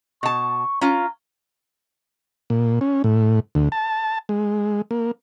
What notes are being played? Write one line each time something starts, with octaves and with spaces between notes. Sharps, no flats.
B2 A5 C#6
C#4 F4 A#5
A#2
C#4
A2
D2
A5
G#3
A#3